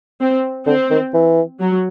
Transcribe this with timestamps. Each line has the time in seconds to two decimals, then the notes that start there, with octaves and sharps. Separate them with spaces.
0.20 C4
0.67 D3 C4
0.91 D#3
1.14 E3
1.60 F#3